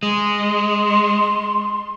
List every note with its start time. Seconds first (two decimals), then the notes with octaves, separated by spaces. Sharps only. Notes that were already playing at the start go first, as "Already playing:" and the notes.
0.03 G#3 C6